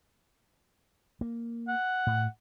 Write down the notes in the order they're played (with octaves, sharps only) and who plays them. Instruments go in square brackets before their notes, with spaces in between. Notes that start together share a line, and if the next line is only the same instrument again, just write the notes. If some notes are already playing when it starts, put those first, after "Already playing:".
[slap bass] A#3
[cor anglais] F#5
[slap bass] A2